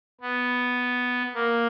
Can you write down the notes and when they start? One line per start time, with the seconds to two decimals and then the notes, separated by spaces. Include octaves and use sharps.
0.21 B3
1.34 A#3